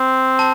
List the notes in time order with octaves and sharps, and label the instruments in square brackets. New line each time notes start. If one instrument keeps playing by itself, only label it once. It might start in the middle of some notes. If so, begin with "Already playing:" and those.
Already playing: [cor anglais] C4
[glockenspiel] A5